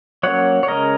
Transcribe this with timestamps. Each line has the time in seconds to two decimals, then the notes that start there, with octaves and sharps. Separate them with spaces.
0.23 F#3 A#3 C#4 C#5 F#5
0.63 C#5
0.67 C#3 G#3 C#4 A#4 D#5